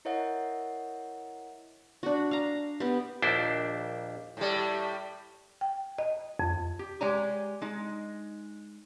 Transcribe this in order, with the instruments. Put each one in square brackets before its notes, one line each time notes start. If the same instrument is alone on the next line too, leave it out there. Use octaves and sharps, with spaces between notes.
[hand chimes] E4 A#4 C#5 D#5 E5 F#5
[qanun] D4 F#4
F5 A#5
B3 G4
[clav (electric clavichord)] A#1 D#2 D4 E4 C5
[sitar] A2 G3
[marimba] G5
D#5
F2
[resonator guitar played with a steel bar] G4
G#3 G4 C#5 D5 G#5 A#5
G#3 D#4